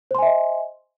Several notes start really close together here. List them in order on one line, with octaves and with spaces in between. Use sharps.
C5 C6 G#5 E5 D#5